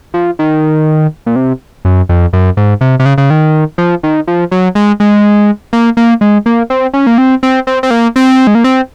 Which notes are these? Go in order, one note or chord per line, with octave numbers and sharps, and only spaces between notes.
F3
D#3
A#2
C3
F#2
F2
F#2
G#2
C3
C3
C#3
C#3
D#3
F3
D#3
F3
F#3
G#3
G#3
A#3
A#3
G#3
A#3
C4
C#4
A#3
C4
C4
C4
C4
A#3
C4
G#3
A#3
C4